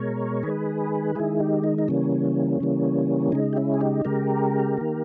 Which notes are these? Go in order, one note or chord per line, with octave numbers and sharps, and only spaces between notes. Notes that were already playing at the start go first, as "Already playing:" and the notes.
Already playing: B2 G#3 A#4 C#5
D#3 G#3 G#4 B4
D#3 G#3 E4 G#4
D#4 G4
D#4
D#4
C#3 E3 G3 A#3 C#4
C#3 E3 G3 A#3
C#3 G#3 D#4
G4
C#4 E4
G#4
D#4 G4
C#3 G#3 G4 A#4
D#3 A#3